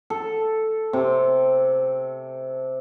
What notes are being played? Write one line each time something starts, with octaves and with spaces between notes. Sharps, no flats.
A4
C3